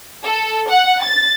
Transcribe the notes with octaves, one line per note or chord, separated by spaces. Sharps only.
A4
F#5
A6